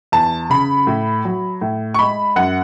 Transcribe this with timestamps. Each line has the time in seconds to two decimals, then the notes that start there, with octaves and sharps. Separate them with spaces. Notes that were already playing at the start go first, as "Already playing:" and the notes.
0.12 E2 A5
0.50 C#3 B5
0.87 A2
1.25 F#3
1.61 A2
1.94 C#6
1.99 G#3 B5
2.36 F#2 F#5